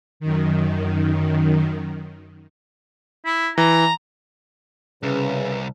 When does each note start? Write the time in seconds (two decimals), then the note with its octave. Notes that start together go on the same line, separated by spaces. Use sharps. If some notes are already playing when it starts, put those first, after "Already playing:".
0.20 F#2 D#3
3.25 E4
3.58 E3 A#5
5.03 C2 C#3 B4